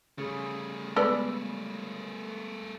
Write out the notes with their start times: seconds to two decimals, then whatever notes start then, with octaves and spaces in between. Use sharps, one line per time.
0.18 C#3 G3 A3 G#4
0.96 G#3 B3 A4 B4 D5